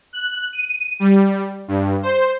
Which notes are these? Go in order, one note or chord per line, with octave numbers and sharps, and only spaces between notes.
F#6
D#7
G3
G2
C5